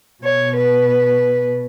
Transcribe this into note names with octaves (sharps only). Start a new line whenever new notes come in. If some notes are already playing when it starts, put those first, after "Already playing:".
B2 C#5
B4